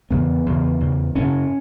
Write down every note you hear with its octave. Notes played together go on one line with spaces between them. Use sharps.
E2 C#3 B3
E2 C#3
E2 C#3
F#2 C#3 C#4